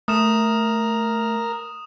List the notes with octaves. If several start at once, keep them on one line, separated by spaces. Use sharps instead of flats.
A3 A#4 D#6 F6 E7